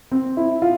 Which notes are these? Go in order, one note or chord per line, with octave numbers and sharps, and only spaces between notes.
C4
E4
F4